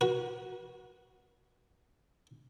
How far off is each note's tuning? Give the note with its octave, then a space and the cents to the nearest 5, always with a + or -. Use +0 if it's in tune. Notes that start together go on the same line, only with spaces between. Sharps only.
F#4 +0 B4 -40